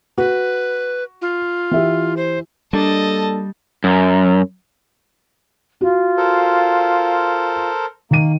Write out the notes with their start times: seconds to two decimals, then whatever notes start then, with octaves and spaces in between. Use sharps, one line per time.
0.18 F#4 B4
1.22 F4
1.71 E3 E4 G4
2.17 C5
2.73 G3 A#3 D4 A4 D#5 A5
3.84 F#2
5.81 F4 F#4
6.17 A4 A#4 C5
8.11 D#3 A#3 D#7